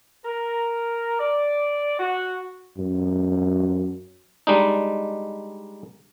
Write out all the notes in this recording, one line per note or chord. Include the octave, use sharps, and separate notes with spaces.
A#4
D5
F#4
F#2
G3 G#3 D4 D#4